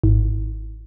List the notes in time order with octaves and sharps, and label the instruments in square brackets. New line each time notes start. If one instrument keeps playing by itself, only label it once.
[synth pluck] G#1